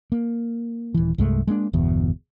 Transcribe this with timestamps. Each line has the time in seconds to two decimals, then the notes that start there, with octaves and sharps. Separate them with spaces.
0.12 A#3
0.94 D#1 E3
1.18 C2 G2 G#3 A3
1.47 G#3 A#3 C4 D4
1.73 G1 E2 B2